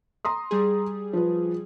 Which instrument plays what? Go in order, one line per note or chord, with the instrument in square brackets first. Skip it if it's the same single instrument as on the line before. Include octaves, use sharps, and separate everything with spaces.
[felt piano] A#5 C6 D#6
[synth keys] G3 G#4
[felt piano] F3 B4